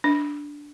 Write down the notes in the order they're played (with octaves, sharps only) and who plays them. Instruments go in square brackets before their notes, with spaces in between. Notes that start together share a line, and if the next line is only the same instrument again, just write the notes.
[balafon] D4